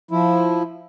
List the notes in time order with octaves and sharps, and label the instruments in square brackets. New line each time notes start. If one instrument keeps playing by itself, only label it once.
[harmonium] F3 E4